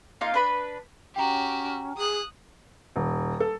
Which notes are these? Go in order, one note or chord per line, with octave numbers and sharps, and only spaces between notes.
A#3 D#4 F4 F5
D4 B4 B5
C#4 F#4 G4 G5 A#5
G#4 D#6 F#6
D#1
A4